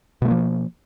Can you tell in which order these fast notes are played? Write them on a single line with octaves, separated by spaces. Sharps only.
B2 A3 A#3 F3